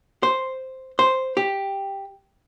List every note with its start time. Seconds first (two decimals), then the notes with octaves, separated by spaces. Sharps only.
0.23 C5
0.99 C5
1.37 G4